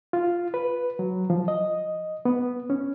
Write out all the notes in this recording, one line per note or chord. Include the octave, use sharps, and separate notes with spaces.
F4
B4
F#3
F3
D#5
B3
C#4